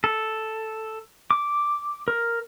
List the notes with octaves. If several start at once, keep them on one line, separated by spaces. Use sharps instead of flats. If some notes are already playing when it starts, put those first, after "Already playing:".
A4
D6
A#4